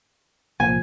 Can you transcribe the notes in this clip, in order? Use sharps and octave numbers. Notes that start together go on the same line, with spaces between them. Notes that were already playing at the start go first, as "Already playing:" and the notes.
C2 A#2 F3 G#5